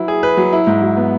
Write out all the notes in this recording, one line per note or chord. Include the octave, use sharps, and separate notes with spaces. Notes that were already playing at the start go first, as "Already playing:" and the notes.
Already playing: F#3 E4 B4
G#4
B4
F#3
E4
G#2
F#3
B3